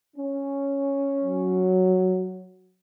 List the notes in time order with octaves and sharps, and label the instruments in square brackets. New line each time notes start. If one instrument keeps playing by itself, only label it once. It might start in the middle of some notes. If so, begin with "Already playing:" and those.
[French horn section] C#4
[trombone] F#3